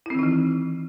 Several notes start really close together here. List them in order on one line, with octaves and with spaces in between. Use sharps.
E4 C4 D#3 D#4 E3